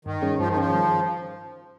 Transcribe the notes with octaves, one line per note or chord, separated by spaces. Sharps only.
G2 D#3
G3 C#4 G#4 C#5
G2 F3
D#3
F3 G3 C#4 G#4 C#5
D#3